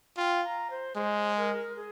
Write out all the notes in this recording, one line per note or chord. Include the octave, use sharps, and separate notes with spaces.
F4 G5
A#5
C5
G#3 C5
A#4
G#4